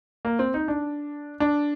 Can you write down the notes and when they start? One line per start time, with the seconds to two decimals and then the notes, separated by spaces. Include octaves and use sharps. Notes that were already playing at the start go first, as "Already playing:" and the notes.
0.25 A#3
0.39 C4
0.54 D#4
0.68 D4
1.40 D4